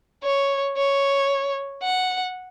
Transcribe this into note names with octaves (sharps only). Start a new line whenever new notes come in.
C#5
C#5
F#5